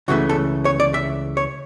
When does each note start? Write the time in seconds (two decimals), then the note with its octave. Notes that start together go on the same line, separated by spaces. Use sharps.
0.08 C#2 C#3 E3 A3 F#4
0.29 A4
0.65 C#5
0.80 D5
0.94 E5
1.37 C#5